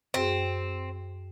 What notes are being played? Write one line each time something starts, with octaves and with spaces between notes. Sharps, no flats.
F#2 C4 F#4 G#4